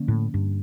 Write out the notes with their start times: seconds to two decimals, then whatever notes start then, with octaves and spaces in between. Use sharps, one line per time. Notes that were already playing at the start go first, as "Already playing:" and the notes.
Already playing: D3 F3 A#3 C#4
0.08 A2
0.34 G2